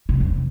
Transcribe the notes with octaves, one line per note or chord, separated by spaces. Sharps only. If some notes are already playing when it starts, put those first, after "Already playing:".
C3
E2